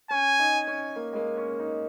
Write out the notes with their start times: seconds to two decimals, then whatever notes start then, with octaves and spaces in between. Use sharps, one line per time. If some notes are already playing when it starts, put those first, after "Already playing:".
0.10 C#4 G#5
0.39 D#4
0.67 C#4
0.96 A#3
1.13 G#3
1.16 A#3
1.37 C#4
1.59 D#4